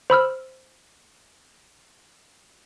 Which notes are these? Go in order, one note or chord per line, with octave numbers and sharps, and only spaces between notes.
C5 B5 E6 F6